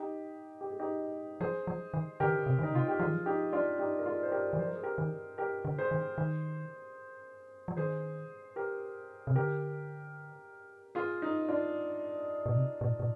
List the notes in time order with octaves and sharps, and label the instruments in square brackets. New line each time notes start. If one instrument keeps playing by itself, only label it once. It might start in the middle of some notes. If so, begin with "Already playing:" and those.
Already playing: [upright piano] D#4 G4
G4
G#4
D#4 G4
[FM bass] F3 [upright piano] G#4 C5
[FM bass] F3
D#3
[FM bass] D3 [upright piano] G4 A#4
[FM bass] D#3
D3
C3
D#3
[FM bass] D3 [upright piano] D#4
[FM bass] C3 [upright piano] F4
[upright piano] G4
[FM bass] F3 [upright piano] F4 G#4
[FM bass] D#3
F3
[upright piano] D#4 G4
D4 F4
D#4 G4
A#4
F4 G#4
C5
G4 A#4
[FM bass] D#3
[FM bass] F3 [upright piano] C5
[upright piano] A#4
G#4
G4 A#4
[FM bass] D#3
[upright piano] G4 A#4
[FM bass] D3
[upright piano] G#4 C5
[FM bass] D#3
D#3
F3
[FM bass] D#3 [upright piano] G#4 C5
[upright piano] G4 A#4
[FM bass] C3
[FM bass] D3 [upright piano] G4 A#4
[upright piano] F4 G#4
D#4
D4 F4
[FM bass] A#2
C3
A#2
A#2